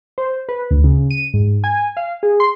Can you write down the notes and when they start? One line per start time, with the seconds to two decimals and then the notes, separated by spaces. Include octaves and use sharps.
0.18 C5
0.49 B4
0.71 D2
0.84 C#3
1.11 D#7
1.34 G#2
1.64 G#5
1.97 F5
2.23 G#4
2.40 C6